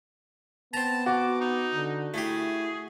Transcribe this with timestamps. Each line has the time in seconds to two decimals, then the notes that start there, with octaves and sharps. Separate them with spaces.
0.74 B3 C4 A5 A#5
1.06 F#4 D6
1.40 D#4
1.74 D3
2.14 A3 E4 G4 G#4